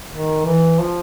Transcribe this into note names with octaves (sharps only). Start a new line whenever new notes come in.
D#3
E3
F3